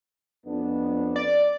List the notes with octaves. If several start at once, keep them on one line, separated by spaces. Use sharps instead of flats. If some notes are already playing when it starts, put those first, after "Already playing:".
F2 B3 D4
D5